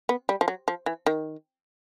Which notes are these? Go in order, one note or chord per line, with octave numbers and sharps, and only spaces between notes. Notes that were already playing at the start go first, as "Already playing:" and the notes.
B3
G3
F3
F#3
F3
E3
D#3